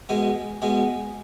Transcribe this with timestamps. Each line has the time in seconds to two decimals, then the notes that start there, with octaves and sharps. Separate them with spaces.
0.09 B2 G#3 B3 G#5
0.62 B2 G#3 B3 G#5